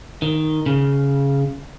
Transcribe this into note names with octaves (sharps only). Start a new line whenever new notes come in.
D#3
C#3